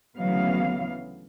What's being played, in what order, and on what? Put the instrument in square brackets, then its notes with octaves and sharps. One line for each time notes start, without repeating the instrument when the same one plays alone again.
[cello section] D2 C#3 E3 F#3 B3 F5